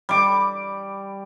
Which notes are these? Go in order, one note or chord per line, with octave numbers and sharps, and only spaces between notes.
G3 D6